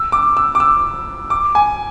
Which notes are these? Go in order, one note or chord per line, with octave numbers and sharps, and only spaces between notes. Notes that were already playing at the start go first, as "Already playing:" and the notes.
Already playing: E6
D6
E6
D6
E6
D6
G#5